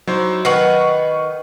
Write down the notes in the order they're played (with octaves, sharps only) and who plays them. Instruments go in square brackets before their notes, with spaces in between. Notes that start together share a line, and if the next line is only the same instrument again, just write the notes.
[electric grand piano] F#3 C5 [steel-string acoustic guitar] D#4 E4
[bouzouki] D#3 F#5 [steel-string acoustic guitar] B4 [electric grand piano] C#6 C7